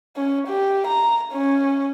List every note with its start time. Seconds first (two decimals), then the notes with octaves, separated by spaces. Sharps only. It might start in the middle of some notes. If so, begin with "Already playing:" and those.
0.16 C#4
0.47 G4
0.87 A#5
1.32 C#4